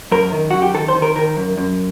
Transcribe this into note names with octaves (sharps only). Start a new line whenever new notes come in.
F#2 A#4
D#3
F#2 F#4
G4
D#3 A4
C5
D#3
A#4
D#3 A#4
F#2
F#2